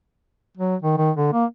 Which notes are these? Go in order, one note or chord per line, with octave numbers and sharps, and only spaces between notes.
F#3
D#3
D#3
D3
A#3